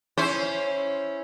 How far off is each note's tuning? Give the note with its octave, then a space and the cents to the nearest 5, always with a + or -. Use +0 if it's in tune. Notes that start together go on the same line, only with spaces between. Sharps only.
C#4 +0 E4 +0 C5 +0